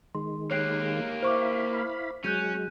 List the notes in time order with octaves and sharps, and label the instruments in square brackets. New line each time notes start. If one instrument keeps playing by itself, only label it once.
[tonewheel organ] D#3 G#3 [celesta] C6
[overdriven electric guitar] A#3 G4 [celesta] C#5 F#6 C7
[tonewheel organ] E4 F5 B5 [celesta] C5 C#6 D6
[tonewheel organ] F#3 G#3 [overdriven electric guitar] C#4 [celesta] F#6 G6 D#7